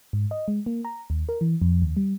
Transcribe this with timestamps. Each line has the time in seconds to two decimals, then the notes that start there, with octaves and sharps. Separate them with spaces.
0.13 G#2
0.31 D#5
0.48 G#3
0.66 A#3
0.85 A#5
1.10 D#2
1.29 A#4
1.41 E3
1.62 F2
1.82 D#2
1.97 G3